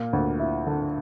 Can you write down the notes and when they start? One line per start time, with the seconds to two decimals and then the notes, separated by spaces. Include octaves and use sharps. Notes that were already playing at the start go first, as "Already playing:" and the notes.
Already playing: A#2 A#3
0.13 D2
0.40 E4
0.66 D3